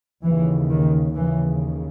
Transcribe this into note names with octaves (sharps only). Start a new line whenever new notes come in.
D#2 C#3 E3
D#3
D#2 C#3 E3